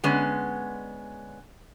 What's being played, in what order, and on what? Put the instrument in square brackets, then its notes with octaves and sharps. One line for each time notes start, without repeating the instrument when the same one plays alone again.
[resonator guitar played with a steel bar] D3 G#3 B3 C#4